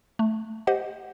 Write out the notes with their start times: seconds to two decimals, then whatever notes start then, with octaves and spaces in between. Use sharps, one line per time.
0.19 A3
0.67 G4 C5 D#5 F#5